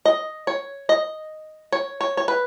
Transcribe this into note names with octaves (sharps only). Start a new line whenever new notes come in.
D#5
C#5
D#5
C#5
C#5
C#5
B4